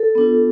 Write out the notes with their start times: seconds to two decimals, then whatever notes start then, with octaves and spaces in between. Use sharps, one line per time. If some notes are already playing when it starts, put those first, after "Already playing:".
Already playing: A4
0.15 B3 D4 F4